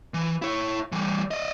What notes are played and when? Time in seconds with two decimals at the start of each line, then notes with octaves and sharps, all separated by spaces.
0.14 E3
0.42 E4 C#5
0.92 E3 G3
1.31 D5 D#5